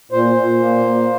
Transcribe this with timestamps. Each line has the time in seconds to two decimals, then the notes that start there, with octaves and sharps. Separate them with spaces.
0.12 A#2 C5
0.36 A#2
0.60 A#3